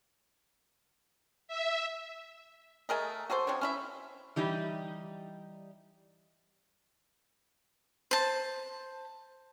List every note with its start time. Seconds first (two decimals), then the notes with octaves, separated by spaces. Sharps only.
1.48 E5
2.89 A3 G#4 A#4 D#5
3.30 F#4 G#4 A4 C5
3.47 F3 C4 D4 C#5
3.61 C#4 E4 E5
4.36 E3 G3 D#4 G4
8.11 C5 A5